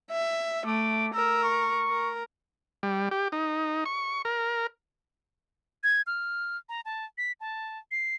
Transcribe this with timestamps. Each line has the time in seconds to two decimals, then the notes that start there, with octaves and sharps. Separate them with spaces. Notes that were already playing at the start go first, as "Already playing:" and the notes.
0.12 E5
0.66 A3 D6
1.14 A#4 E6
1.43 C#6
1.89 A#4
2.83 G3
3.11 G4
3.32 D#4
3.86 C#6
4.25 A#4
5.84 G#6
6.07 F6
6.69 A#5
6.85 A5
7.18 B6
7.41 A5
7.91 C7